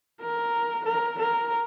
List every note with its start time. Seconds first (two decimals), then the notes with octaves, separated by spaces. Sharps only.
0.21 A#4
0.85 A#4
1.19 A#4